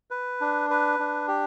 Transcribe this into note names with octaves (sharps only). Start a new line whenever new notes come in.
B4
D4
B4
D4
G4